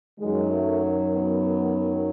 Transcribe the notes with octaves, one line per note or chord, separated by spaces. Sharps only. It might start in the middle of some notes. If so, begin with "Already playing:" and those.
F#2 D#3 F#3 G#3
A3
B3